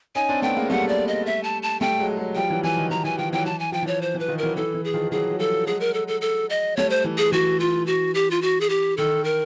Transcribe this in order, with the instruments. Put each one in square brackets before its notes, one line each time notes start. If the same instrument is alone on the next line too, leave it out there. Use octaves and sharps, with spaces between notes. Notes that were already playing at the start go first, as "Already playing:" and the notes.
[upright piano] C#4 D#4 [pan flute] G#5
[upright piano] C4 D4
[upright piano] A3 B3 [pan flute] G5
[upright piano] G#3 A#3
[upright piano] G3 A3 [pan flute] F#5
[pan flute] D5
D#5
E5
A5
A5
[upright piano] G3 A3 [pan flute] G5
[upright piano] F#3 G#3
F#3 G#3
[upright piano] F3 G3 [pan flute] G5
[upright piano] E3 F#3
[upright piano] E3 [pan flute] G#5
[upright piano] D#3
[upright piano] E3 [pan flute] A#5
[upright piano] E3 [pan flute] G#5
[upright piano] D#3 F3 [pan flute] G5
[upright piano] E3 F#3 [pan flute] G5
[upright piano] E3 [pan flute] A5
[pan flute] G#5
[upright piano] F3 [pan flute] G5
[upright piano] E3 [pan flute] C#5
[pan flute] C5
[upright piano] E3
[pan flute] B4
[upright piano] D#3 F3
[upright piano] E3 F#3 [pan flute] A#4
[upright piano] E3 [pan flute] A4
[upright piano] E3
[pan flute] G#4
[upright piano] D#3 F3
[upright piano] E3 F#3 [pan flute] G#4
[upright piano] F#3
[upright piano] F3 G3 [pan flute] A4
[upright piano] F#3 G#3 [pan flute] G#4
[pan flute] A#4
A4
A4
A4
D#5
[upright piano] G3 A3 [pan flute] C#5
[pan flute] C5
[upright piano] E3
[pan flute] G#4
[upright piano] E3 [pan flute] F#4
[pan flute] F4
F#4
G4
F4
F#4
G#4
G4
[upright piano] D#3 [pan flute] A4
[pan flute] A#4